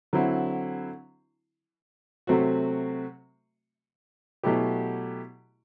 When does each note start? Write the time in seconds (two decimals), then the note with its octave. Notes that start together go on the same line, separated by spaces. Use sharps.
0.13 D3 F#3 C4 E4
2.27 C3 F#3 A3 C4 F#4
4.43 B2 F#3 A3 E4 G4